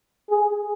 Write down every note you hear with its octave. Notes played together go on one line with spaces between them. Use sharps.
G#4